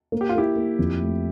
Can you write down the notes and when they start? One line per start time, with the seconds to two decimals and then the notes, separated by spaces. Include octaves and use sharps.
0.12 A#3
0.21 G4
0.29 F4
0.35 A#3 E4 G4
0.56 A#3
0.79 F2
1.00 A3